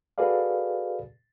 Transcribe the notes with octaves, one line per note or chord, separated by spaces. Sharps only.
F#4 G#4 A4 B4 D5 F5